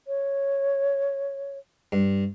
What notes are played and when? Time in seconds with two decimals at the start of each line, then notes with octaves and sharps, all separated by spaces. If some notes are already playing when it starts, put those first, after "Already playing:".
0.07 C#5
1.92 G2